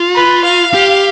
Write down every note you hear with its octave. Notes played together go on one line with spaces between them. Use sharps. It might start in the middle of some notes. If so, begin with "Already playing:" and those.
Already playing: F4
B4
F5
G4